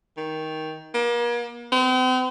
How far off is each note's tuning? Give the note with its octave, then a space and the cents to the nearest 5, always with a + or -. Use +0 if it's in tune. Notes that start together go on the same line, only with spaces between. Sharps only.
D#3 +15
A#3 +40
C4 -40